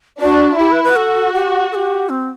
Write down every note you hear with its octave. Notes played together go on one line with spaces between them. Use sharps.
D4 F#4
E4 G4
B4
B4
F#4 A4
G4
A4
G4
C4